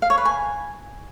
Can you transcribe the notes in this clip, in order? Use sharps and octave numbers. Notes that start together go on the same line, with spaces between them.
F5
C#5
B4
G#5